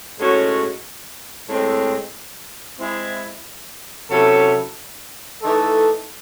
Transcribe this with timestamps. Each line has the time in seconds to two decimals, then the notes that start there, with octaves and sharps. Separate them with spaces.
0.18 A2 G#3 C#4 F#4
1.48 A2 G#3 C4
2.79 G#3 C4 E4
4.10 C3 F#3 C#4 E4 A4
5.41 E3 A3 D#4 A4